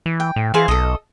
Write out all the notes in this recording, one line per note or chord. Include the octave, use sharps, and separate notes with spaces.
E3
G5
A2
E3 G#4 C5 F5
B1 A4 D#5